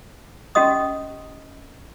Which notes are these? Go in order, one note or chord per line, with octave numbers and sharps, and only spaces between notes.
C#4 F#4 G4 D#5 D#6